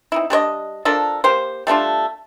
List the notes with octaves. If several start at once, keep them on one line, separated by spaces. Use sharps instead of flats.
C4 D#4 E4
G3 D4 C#5 D#5
F3 D4 A4 A#4
A#3 G4 C5
G3 A3 D4 F4